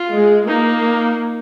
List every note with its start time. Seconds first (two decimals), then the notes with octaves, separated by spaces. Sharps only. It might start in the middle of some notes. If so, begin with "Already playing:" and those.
Already playing: F4
0.12 G#3
0.47 A#3 D#4